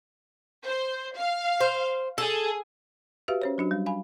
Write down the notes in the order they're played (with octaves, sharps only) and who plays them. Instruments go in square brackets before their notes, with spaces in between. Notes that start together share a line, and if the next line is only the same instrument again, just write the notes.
[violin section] C5
F5
[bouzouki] C5
[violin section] G#4 [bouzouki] A4
[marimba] F#4 G4 B4 E5 F5
C#4 C5 C#5
F#3 D4 F#4
G3
F5 G#5 B5